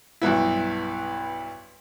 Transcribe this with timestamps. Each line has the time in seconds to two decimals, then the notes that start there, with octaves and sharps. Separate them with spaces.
0.21 B1 G2 B3 E4